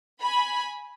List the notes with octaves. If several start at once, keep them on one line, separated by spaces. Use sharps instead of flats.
G#5 B5